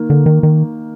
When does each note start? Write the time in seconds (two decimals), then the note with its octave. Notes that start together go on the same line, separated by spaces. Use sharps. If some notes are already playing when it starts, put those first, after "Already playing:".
Already playing: D#3 A#3
0.10 D3
0.26 D#3
0.43 D#3